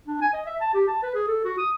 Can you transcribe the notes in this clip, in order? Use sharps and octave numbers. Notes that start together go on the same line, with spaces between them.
D4
G#5
D#5
E5
A5
G4
A5
B4
G#4
A4
F#4
D#6